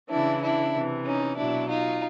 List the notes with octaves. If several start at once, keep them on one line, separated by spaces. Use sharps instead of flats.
C#3 E3 D4 E4
D4 E4
C3 E3
C#4 D#4
B2 F#3 D4 E4
D#4 F4